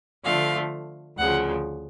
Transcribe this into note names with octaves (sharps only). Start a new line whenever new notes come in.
D3 F3 A3 F5
D2 C#3 F3 F#5